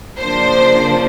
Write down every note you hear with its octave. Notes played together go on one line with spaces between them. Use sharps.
C#3 F3 A#3 D4 C5